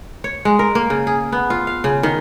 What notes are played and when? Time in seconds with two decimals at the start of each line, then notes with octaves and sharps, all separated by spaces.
0.24 C#5
0.45 G#3
0.59 A#4
0.75 A#3
0.90 C#3
1.07 G#4
1.32 B3
1.50 F4
1.67 F5
1.84 C#3
2.03 D#3